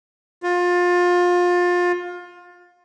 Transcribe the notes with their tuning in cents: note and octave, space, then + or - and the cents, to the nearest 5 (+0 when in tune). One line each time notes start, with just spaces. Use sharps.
F4 +25